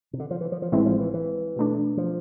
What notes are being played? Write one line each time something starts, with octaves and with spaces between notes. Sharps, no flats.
C3
D3
F3
E3
F3
F3
A1 A2 E3 G#3 C4 E4
F3
E3
E3
B2 A3 D4
F3